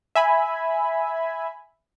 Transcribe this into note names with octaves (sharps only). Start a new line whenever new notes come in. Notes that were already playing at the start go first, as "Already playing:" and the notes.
E5 G#5 B5